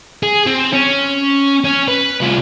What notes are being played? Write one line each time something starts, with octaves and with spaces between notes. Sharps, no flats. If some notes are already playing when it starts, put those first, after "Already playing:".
G#4
C4
C#4
C#4
B4
C2 F4